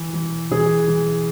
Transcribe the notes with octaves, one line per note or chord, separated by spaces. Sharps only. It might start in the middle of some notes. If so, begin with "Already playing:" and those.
Already playing: E3
E3
E3 G#4
E3